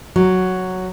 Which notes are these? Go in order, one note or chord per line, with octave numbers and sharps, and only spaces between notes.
F#3